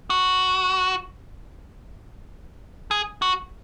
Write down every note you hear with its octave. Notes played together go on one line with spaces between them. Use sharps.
F#4
G#4
F#4